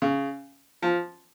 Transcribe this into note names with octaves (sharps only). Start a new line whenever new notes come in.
C#3
F3